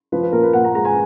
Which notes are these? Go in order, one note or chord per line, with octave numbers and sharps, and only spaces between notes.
F3 B4
B4
A#2 A#4
B4
A#2 F#5
A#5
G#3 A#5
G#5